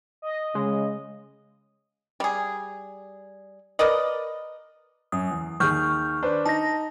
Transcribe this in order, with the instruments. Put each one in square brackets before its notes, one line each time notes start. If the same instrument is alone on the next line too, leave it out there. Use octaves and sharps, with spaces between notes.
[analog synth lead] D#5
[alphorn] C#3 [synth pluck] G#3
[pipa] G3 G#4
A#4 B4 D5 D#5
[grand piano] F#2 [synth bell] D#6
[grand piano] E2
[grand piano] D#2 G#4 [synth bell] C#6 F6 G6
[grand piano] D4 B4 C5
[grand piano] D#4 [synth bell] A5 A#6